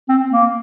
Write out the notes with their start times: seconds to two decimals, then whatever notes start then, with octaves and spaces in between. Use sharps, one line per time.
0.09 C4
0.31 A#3